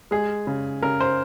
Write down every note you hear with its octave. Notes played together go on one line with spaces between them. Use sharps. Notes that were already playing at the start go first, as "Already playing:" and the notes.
G#3 G#4
C#3
C#3 A#4
C5